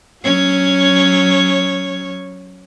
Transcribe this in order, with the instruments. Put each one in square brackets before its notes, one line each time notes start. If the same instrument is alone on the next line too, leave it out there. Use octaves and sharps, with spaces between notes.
[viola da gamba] F#3 C#4 C#5